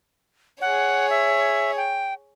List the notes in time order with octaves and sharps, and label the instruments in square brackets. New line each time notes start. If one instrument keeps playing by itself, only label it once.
[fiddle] G#4 C#5 [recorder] F#5
[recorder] E5
G5